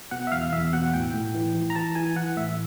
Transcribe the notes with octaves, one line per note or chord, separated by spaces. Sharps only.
B2 F#5
E5
E2 F5
E2 E5
B2 F#5
A2 G5
A2
E3
E3
A#5
E3 A5
E3 G#5
E3 F#5
A2 E5